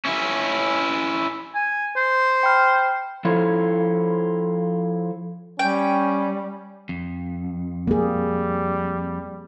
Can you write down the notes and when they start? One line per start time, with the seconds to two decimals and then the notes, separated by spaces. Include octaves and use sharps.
0.05 C#4 E4
1.55 G#5
1.96 C5
2.43 G5 B5 F6
3.25 F3 E4 F4 A4 C#5
5.59 G3 C#4 G5
6.89 F2
7.87 G3 A#3 G#4